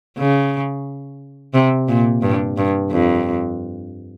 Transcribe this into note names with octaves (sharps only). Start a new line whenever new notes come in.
C#3
C3
A#2
G2
G2
F2